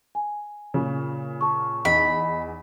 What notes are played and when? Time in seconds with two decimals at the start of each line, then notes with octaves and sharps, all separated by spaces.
0.15 G#5
0.74 A#2 C#3
1.41 A5 C#6
1.85 E2 D#4 D#5 B5